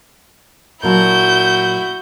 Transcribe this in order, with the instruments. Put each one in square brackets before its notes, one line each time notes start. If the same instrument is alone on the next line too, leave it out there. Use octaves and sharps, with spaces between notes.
[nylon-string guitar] A#2 F#3 A5 [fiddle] E4 F#4 [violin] G6